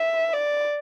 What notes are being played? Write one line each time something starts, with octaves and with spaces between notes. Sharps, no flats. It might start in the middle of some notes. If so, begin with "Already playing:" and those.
Already playing: E5
D5